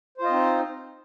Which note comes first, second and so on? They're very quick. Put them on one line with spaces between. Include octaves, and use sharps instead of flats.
C5 F4 D#5 C4 D#4